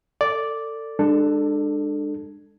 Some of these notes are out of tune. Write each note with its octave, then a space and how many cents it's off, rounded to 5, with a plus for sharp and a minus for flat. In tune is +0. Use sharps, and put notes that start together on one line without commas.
A4 +30 D5 -5
G#3 -35 D4 +25 A4 +5